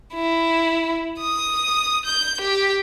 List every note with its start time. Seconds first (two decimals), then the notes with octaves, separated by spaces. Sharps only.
0.15 E4
1.20 D#6
2.06 G6
2.41 G4